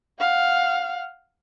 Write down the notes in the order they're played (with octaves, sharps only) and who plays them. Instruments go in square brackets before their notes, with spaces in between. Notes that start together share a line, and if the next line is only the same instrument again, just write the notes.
[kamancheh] F5 F#5